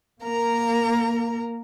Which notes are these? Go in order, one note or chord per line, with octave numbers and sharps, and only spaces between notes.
A#3 A#4 A#5